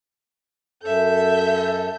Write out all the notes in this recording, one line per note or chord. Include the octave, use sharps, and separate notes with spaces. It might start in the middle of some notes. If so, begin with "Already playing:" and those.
F#2 A4 E5 G6